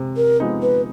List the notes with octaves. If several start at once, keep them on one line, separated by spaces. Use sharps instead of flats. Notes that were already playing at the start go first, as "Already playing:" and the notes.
Already playing: C3 G#3
A#4
F3 G#3 B3 D#4
B4